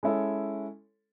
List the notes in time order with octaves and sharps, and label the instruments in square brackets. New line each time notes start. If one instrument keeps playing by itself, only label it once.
[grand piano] G#3 C#4 E4 A4 C#5